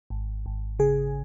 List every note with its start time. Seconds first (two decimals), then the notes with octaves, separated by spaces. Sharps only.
0.10 G#1
0.46 G#1
0.79 C#3 G#4